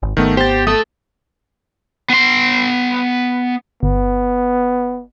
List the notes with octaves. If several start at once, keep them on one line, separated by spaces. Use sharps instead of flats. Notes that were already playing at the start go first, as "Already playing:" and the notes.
G#1
G#1 D#3 A3 B3
G4 C5 A6
A3 A4 D#6
B3 C6
G1 B3